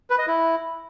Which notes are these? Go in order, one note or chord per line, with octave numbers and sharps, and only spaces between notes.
B4
D#5
E4